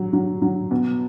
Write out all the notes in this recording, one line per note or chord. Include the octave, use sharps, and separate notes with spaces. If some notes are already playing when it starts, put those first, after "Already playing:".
Already playing: F#3
F#3
F#3
B2